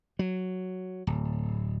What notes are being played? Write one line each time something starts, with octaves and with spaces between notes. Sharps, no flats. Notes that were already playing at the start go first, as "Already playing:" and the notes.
F#3
D1